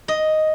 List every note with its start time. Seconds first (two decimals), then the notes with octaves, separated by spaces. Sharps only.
0.08 D#5